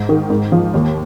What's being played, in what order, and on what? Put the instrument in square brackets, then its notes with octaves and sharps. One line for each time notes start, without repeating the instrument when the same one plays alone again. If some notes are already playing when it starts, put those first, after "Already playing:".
Already playing: [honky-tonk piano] G#2
D#3
G#2
F3
D#2